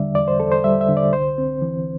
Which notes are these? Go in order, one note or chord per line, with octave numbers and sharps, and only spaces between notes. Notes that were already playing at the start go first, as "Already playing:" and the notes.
Already playing: E2 D3 G3 D5 E5
E2 D5
C5
E2 A4
C5
G3 E5
E5
D3
D5
C2 C5
C4
E3